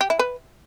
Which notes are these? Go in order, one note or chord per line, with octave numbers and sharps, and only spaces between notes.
G4
E4
B4